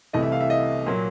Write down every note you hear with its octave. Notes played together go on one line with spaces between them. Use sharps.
C2 C3 E3 A3 D#5
E5
F5
E5
D#5
A#2 F#3 A#3